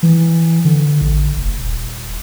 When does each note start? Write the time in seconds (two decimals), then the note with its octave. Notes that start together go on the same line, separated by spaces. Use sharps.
0.03 E3
0.65 D3
1.01 A1
1.37 F1
1.58 D#1